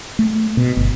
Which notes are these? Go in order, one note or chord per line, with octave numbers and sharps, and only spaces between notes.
A3
B2
G1